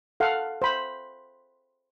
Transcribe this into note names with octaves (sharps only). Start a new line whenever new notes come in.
A4 F5 F#5
C5 B5